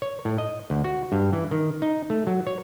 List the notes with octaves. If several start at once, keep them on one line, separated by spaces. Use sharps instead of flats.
C#5
A2
D#5
D2
F#4
G2
E3
D#3
D#4
A3
F#3
C#5